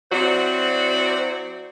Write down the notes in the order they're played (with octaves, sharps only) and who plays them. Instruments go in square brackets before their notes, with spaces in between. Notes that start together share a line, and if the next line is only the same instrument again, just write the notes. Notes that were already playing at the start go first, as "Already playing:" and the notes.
[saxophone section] F#3 C4 E4 F#4 C5 D5